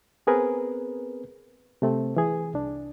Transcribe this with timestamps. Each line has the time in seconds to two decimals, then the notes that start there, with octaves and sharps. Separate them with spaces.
0.27 B3 C4 G#4 A#4 B4
1.82 C3 A3 C4
2.16 E3 G#4
2.54 C2 D4